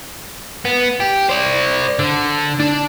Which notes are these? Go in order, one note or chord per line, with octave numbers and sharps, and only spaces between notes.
B3
G4
C5 D5
D3
D4